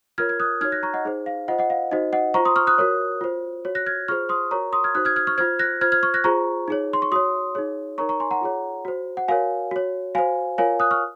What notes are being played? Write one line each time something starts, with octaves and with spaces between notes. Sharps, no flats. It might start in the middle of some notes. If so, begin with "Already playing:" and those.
F4 A#4 C#5 F6 G#6
G#6
D#6 F#6
D#4 F#4 C#5 F6 G#6
F#6 A#6
A#5 C#6
D#5 F#5
D#4 G#4 C5
F5
F4 C5 D#5 F#5
D#5 F#5
F5
D#4 F#4 C5 D#5
D#5 F#5
F4 C5 A#5 C#6
C6 D#6
C#6 F6
D#6 F#6
F#4 A#4 C#5
F4 C5
F#4 C#5
F#6 A#6
F6 G#6
F4 G#4 C5 C#6 F6
C6 D#6
F#4 A#4 C#5 A#5 C#6
C6 D#6
F6 G#6
D#4 F#4 C5 D#6 F#6
F6 G#6
F6 G#6
C#6 F6
F4 C5 F6 G#6
F#6 A#6
F4 C5 F6 G#6
F6 G#6
C#6 F6
F#6 A#6
F4 G#4 C5 A#5 C#6
D#4 G#4 C#5
C6
C#6
F#4 C#5 C6 D#6
D#4 G#4 C#5
D#4 A#4 C#5 A#5 C#6
A#5 C#6
G#5 C6
F#5 A#5
F4 G#4 C#5
F#4 C5
F#5
F#4 A#4 C#5 F5 G#5
F#4 C#5
F#4 C5 F5 G#5
F4 A#4 C#5 F5 G#5
D#6 F#6
C#6 F6